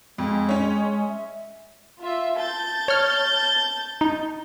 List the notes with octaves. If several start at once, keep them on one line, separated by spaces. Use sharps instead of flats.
F2 G#3
C#4 C#5
E5
F4 E5
A5 G6 A6
C#5 F6
D#4